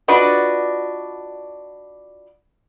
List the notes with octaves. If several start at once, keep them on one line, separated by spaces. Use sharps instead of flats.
D4 F4 F#4 B4 D5 D#5